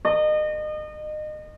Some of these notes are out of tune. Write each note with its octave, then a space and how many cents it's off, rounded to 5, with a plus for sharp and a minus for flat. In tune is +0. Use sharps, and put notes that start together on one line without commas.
D#5 -30